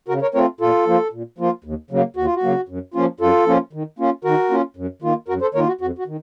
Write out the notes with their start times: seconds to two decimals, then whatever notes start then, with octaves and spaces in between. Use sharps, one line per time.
0.08 C#3 F#4 A#4
0.22 A#4 C#5
0.34 A3 C4 F4 A#4 C#5
0.60 A#2 F4 A4
0.86 F3 A#3 F4
1.13 A#2
1.38 F3 A#3 F4
1.64 D#2
1.91 C#3 F#3 A#3
2.16 D#2 F#4
2.25 F4
2.35 F#4
2.43 C#3 F#3 A#3
2.69 F#2
2.94 F3 A#3 C#4 F4
3.20 F#2 F4 A4
3.46 F3 A#3 C#4 F4
3.73 D#3
3.99 A#3 C#4 F4
4.24 D#3 F#4 A#4
4.50 A#3 C#4 F4
4.77 F#2
5.02 D#3 A#3 F4
5.28 F#2 F#4 A#4
5.41 A4 C5
5.54 D#3 A#3 F4 A#4 C#5
5.67 F#4
5.81 F2 F#4
5.99 F#4
6.07 D#3